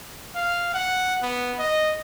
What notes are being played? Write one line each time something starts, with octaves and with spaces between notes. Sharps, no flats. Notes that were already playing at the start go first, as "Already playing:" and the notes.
F5
F#5
B3
D#5